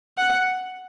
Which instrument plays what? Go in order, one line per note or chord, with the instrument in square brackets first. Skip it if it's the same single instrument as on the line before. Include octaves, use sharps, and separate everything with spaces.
[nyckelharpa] F#5